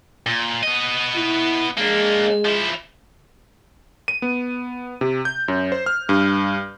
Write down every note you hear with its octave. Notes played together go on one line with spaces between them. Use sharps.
A#2
B3 D#5
E4
G#3 A#3 D4
F3 E4
D#7
B3
C3
G6
F#2
C5
F6
G2